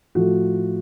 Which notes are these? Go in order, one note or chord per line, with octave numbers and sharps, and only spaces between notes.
A2 F3 A3 F#4